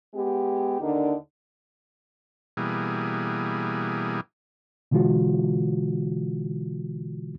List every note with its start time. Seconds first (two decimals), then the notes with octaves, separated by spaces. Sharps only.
0.14 G#3 B3 G4
0.80 D#2 D3 D4 D#4 A#4
2.57 B2 E3 G3 A#3 G#4
4.91 B2 D3 E3 G#3 F4 F#4